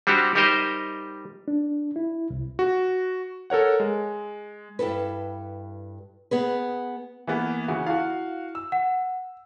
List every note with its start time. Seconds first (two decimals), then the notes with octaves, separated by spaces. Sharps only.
0.07 G3 C4 D4 F#4 G4
0.35 G3 D#4 G4 A#4 C5 D#5
1.48 D4
1.96 E4
2.30 C2
2.59 F#4
3.50 A4 A#4 C#5 F#5
3.80 G#3
4.79 G2 E4 A4 B4
6.31 B3 G#4 B4
7.27 E3 A#3 B3
7.68 C#3 E3 F#4
7.86 E4 F#4 F5
8.55 E6
8.72 F#5